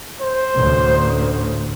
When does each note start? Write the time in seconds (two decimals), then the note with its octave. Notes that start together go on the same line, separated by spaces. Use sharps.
0.21 C5
0.55 A1 D2 A2